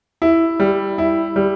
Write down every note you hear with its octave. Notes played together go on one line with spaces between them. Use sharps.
E4
G3
E4
G3